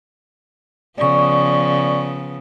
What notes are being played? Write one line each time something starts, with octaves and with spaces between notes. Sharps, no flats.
C#3 F3 B3 D5 C#6